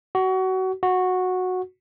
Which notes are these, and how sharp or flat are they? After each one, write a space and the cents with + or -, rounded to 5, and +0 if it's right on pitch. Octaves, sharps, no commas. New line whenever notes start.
F#4 +25
F#4 -10